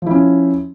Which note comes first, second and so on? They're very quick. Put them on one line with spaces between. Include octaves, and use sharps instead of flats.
F3 E4 C#4